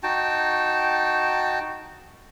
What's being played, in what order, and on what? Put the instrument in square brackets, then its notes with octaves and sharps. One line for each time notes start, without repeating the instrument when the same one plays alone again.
[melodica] D#4 F#4 G5 A5